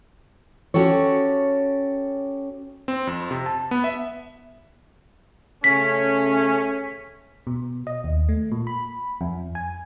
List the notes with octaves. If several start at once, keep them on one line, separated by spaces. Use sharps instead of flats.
C#4 F#4 G4 A4 C#5
C4
F2
C3
A5
B3
E5
C#3 A3 C#4 B6
B2
D#5
D#2
A3
A#2
B5
F2
G#5